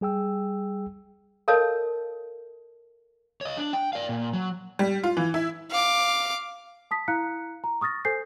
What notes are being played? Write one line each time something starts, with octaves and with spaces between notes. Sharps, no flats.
G3 G#4 G5 E6
A4 A#4 C#5 D#5 F5 A5
C#5 D#5
D4
G5
D5 F5
A#2
F#3
G3
F4
E3
E4
F5 D6
A5 D#6 B6
E4 F5 A#5 F#6 C#7
A#5
C#6 D#6 F6 A6 A#6
A4 C5 G#5 G6 C7